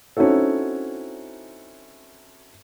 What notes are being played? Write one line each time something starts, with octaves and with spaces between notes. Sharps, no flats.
C4 C#4 D#4 E4 F#4 A4